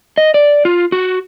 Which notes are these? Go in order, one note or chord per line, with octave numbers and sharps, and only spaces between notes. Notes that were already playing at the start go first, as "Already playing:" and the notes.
D#5
D5
F4
F#4